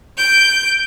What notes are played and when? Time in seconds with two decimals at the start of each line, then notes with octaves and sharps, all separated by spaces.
0.17 G6 D7